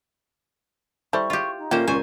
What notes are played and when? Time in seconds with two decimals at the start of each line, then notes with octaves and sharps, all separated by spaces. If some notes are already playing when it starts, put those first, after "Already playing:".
1.13 G3 E4 A4 C5 C#6
1.30 F4 G4
1.58 D#4
1.71 A#2 A3 A#3 C#4 C5 G5
1.87 C#2 A#2 G#4 C5 G#5 C#6